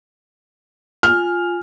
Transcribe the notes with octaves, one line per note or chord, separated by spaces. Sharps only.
F4 G#5 F6